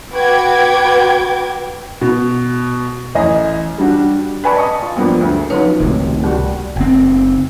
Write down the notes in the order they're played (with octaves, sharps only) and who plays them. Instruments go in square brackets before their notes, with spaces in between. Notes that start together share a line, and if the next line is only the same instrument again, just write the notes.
[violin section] F#4 B4 G5 D6 G#6
[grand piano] B2
A1 D#5 G#5
G3 D4 F#4
[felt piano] B4 D5 G#5 A5 B5 C#6
D#5 A5 C#6 D#6
F4
G2 F3 G3 A#3 B3
D2
[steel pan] F3 F#3 C#4 [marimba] D#4 B4 C#5
[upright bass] C#2 [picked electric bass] A2 C3 D#3
[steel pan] G3 F#4
[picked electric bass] F#1 C4